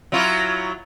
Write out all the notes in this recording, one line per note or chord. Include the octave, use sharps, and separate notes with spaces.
F#3 E4 F4